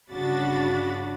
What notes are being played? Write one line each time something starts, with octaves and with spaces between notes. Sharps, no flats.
G1 C#3 D4 F#4 B5 A6